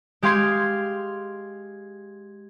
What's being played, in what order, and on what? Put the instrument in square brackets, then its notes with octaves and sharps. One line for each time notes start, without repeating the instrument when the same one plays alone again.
[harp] G#3 G4 F5 C6 G#6 C7